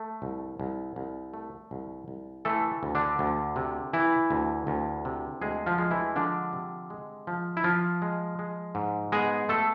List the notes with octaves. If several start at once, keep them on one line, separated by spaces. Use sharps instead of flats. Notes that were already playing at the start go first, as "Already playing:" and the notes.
Already playing: A3
C2
C2
C2
A3
C2
C2
E3 A3 A4
D2
D3 D4
D2
C3
E3 E4
D2
D2
C3
D2 G#3 G#4
F3 F4
G#3
E3 E4
D3 F3 D4
C3
G#3
F3
E4
F3 F4
G#3
G#3
G#2
G#3 B3 G#4
A3 A4